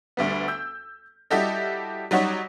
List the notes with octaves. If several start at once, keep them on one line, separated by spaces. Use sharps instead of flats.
D2 G3 B3
E6 G6
G3 E4 F#4 G4 A4 D#5
F#3 G3 D#4 F#4 C#5